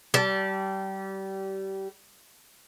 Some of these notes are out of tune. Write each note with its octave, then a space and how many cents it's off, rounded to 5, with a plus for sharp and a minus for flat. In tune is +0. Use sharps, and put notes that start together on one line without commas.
G3 -25 A5 -10